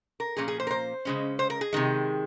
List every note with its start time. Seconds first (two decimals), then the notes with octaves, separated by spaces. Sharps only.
0.20 A#4
0.37 A#2 F3 A#3 C#4 G#4
0.48 G#4
0.60 C5
0.67 A#4
0.71 C5
1.05 C#3 G#3 C#4
1.39 C5
1.50 A#4
1.61 G#4
1.73 C3 D#3 G#3